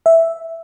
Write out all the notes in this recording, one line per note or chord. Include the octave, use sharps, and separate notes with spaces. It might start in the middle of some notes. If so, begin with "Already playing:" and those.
E5